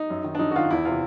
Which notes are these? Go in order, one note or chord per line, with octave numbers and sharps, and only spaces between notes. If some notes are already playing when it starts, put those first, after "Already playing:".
Already playing: D#4
F#2
D#3
D4
F#2 D#4
F#4
D#3 F4
E2 E4
C3 E3 F4